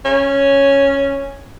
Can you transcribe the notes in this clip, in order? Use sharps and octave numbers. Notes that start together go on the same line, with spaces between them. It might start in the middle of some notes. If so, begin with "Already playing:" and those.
C#4